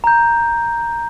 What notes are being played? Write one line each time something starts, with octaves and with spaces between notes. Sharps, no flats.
A#5 G6